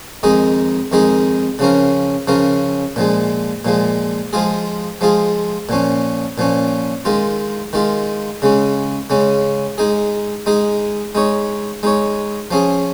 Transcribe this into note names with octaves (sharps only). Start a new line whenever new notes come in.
F2 D#3 G#3 D#4 G#4
F2 D#3 G#3 D#4 G#4
C#3 F3 C#4 A#4
C#3 F3 C#4 A#4
A#2 F3 G#3
A#2 F3 G#3
F3 G#3 F4 G#4
F3 G#3 F4 G#4
A#2 F3 C#4
A#2 F3 C#4
D#3 G#3 F4
D#3 G#3 F4
C#3 G#3 C#4
C#3 G#3 C#4
G#3 D#4 G#4
G#3 D#4 G#4
G#3 D#4 C#5
G#3 D#4 C#5
F3 C#4 G#4